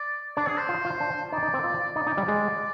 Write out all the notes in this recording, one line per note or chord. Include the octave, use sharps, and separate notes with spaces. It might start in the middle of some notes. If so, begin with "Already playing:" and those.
Already playing: D5
D4 D5
G#4
C5
F4
F4
D4
D#4 D5
D#4
C4
F4
D#4 D5
D#4
G3
G#3